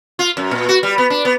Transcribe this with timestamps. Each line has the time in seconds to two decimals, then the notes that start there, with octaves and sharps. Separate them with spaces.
0.19 F4
0.37 F#2
0.51 A#2
0.69 F#4
0.83 G3
0.98 B3
1.10 D4
1.25 B3